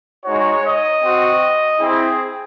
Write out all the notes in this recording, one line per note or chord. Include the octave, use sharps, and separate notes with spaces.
G#3 D#4 F#4 C#5
D#5
C4 F#4
C4 E4 G#4